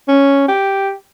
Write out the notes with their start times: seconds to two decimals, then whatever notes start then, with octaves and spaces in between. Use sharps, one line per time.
0.08 C#4
0.48 G4